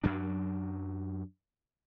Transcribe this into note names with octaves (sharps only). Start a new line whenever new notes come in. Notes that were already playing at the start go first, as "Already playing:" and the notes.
F#2 F#3 D4